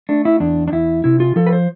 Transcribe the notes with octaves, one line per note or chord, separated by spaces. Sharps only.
A3 D4
E4
E2 D4
D4
E2 E4
C3 E4
F4
F3 A4
B4
C5